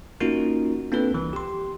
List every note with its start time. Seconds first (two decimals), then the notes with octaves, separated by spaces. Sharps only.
0.20 A#3 C#4 D#4 F4 F#4 A#4
0.92 A#3 C4 D4 F4 A4 B4
1.11 C2 E3
1.33 G4 C6